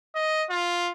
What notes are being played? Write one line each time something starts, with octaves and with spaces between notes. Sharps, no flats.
D#5
F4